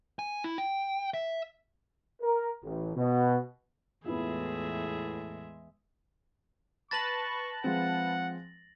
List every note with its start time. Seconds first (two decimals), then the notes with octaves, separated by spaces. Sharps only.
0.19 G#5
0.44 E4
0.58 G5
1.14 E5
2.21 A#4
2.63 A1
2.96 B2
4.06 E2 A2 G#3 B3 E4 F4 G#4 E5
6.91 B4 A5 B5 C#6 A6 A#6 F#7
7.64 F3 G#3 C4 F#5